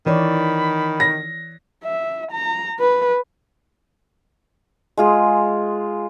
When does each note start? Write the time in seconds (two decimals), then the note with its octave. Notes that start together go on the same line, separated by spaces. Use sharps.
0.06 D#3 E3 C#5 D5 B5
1.00 A#6
1.84 E5
2.32 A#5
2.80 B4
4.97 G#3 F4 G#4